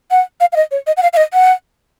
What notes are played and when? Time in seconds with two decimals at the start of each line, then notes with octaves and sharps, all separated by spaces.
0.11 F#5
0.40 F5
0.52 F5
0.56 D#5
0.71 C#5
0.87 D#5
0.97 F#5
1.03 F5
1.13 F5
1.17 D#5
1.33 F#5